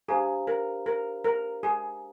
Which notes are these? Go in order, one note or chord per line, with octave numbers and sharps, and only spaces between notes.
D4 G4 G#4 C5 F5 A#5
A#4
A#4
A#4
G#4